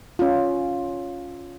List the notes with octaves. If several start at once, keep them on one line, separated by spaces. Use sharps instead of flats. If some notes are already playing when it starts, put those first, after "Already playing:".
C#4 F4